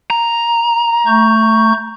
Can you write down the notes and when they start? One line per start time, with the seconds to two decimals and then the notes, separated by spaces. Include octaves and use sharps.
0.10 A#5
1.06 A3 C#6 G6